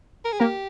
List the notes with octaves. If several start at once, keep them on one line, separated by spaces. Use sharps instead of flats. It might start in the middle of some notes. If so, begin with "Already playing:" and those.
A#4
G#4
A#3 G4 A#4